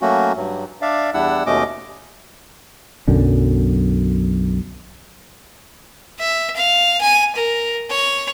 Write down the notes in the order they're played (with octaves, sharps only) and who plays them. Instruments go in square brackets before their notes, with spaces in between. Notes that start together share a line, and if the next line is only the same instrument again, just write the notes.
[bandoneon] F#3 A3 A#3 C#4 F#4
G2 F#3
D4 D5 E5 F5
E2 G3 D4 E4 F#5 E6
D#2 B2 A3 C#4 D#5 D6
[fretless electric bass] B1 F#2 D3
[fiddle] E5
F5
G#5
A#4
C#5